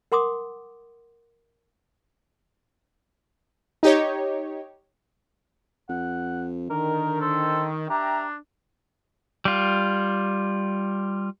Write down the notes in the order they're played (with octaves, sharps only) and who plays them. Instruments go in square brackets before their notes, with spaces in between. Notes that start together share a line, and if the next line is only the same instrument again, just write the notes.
[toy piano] A#4 F#5 C6 D6 D#6
[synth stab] D#4 G4 C#5
[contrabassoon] F2 [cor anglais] F#5
[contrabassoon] D3 [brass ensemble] D#3 [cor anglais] A#4
[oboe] A4 [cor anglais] C5
[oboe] D4 [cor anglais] G4 [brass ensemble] E5 G5 A#5
[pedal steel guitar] G3 F4